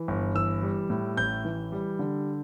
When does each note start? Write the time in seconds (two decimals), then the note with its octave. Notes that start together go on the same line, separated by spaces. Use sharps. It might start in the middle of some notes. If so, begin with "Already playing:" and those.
Already playing: E3
0.08 G1
0.35 E3 E6
0.62 G3
0.90 A2
1.17 A1 G6
1.45 E3
1.72 G3
1.99 D3